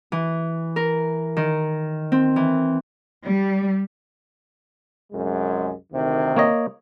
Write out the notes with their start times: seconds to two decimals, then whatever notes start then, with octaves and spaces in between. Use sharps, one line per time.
0.12 E3
0.76 A#4
1.37 D#3
2.12 C4
2.36 E3
3.23 G3
5.13 C2 F#2 G#3
5.92 D2 C3 D#3
6.37 A#3 C#5 D#5